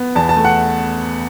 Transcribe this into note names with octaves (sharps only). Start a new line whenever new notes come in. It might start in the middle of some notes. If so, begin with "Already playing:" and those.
Already playing: B3
E2 A5
A5
A3
F#5